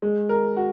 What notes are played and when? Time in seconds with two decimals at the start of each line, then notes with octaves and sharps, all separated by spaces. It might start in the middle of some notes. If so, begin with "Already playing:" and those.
0.02 G#3
0.29 A#4
0.56 F#4